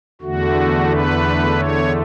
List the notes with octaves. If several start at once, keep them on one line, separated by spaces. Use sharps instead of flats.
E2 D3 A3 F#4
B4
C#5